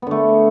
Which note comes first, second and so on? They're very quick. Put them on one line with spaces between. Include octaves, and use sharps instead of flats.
B3 D3 A3